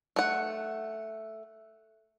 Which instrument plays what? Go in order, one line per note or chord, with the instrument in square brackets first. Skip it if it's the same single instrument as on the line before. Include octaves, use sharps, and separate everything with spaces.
[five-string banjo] A3 F#5